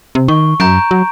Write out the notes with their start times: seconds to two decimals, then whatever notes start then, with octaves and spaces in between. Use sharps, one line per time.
0.15 C3
0.28 D#3 C#6
0.60 F#2 A#5 G6 D7
0.91 F#3